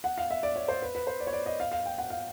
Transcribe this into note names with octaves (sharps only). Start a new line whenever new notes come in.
F#5
F5
E5
D5
C#5
C5
B4
B4
C5
D5
C#5
D5
D#5
F5
F5
G5
F#5
F5